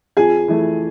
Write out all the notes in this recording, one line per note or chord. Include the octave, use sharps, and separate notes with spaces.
F2 G#4 G#5
E3 A3